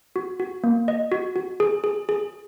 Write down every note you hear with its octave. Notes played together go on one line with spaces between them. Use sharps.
F#4
F#4
A#3
D#5
F#4
F#4
G#4
G#4
G#4